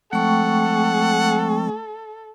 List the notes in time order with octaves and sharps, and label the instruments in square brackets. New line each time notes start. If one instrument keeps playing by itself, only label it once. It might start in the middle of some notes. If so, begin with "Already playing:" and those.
[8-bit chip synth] F3 G#3 C4 [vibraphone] A3 G5 C#6 [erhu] A4 [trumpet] F#5